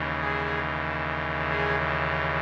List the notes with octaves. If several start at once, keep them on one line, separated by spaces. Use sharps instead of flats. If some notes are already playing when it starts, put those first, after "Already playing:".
Already playing: D#2 C#3 E3
G#4
G#4